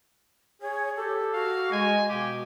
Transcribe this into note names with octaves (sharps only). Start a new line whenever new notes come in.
G#4 C#5
G4 A4
F#4 F5
G#3 G#5
B2 G4 F5